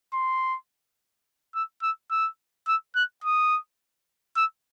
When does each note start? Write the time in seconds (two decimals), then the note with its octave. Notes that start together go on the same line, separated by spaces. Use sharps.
0.14 C6
1.55 E6
1.83 E6
2.11 E6
2.68 E6
2.95 F#6
3.24 D#6
4.37 E6